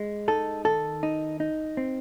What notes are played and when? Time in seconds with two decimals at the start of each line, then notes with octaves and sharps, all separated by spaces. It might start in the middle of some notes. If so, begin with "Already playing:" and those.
Already playing: G#3
0.28 D#4 A4
0.65 D#3 A4
1.03 D#4
1.40 D#4
1.77 C4